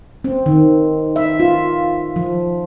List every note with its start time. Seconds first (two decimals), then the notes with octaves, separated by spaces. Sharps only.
0.24 C4
0.46 D#3
1.16 E5
1.40 F4
2.16 F3